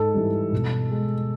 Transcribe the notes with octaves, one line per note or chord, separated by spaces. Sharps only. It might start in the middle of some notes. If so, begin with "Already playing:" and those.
Already playing: G#2 A4
E3 G3
B2
G#3